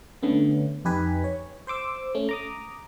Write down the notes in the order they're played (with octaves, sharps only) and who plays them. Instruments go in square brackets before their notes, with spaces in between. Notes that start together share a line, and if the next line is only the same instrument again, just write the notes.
[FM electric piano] D3 A3 B3 C#4
F2 D#4 G4 B4 G#5 B6
C#5
C5 C6 D6 E6
A3 C#4
A#5 D6 D#6